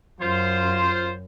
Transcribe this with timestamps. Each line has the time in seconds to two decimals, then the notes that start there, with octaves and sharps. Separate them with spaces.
0.21 F#2 F4 C5